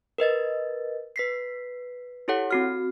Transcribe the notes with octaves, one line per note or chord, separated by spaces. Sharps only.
A#4 B4 D#5 A6
B4 B6 C7
E4 G4 A4 C#5 F#5
C4 F#4 F6